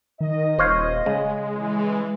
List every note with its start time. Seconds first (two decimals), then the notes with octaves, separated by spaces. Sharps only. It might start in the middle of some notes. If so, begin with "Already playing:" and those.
0.21 D#3 D#5
0.59 D#1 C5 C#5 F5
1.06 C#3 G#3
1.56 E3